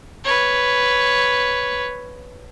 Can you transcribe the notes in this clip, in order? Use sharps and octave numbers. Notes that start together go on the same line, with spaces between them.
B4 C#5